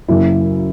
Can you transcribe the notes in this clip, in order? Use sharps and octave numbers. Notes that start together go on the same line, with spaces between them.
F#1 F#2 C#3 F#3 A#3 E4